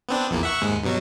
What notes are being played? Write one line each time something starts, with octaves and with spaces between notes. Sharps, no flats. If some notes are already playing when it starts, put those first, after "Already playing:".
B3 C4 D4
A#1 E2 A#3
E5 F#5 C#6
D#2 G#2 G#3
G2 B2 F#3